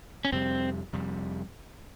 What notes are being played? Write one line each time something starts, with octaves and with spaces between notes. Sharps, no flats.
C#4
F2 C3 G3 C4
F2 C3 G3